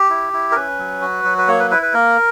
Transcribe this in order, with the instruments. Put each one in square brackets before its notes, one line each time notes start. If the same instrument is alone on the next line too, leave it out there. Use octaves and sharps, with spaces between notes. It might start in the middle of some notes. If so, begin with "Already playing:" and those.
Already playing: [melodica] G4
E4
E4
A#4
C#4 B4
F#3
F#4
F#3
B4
A#3 C#5
B4
E4 B4
B4
A#3 A#4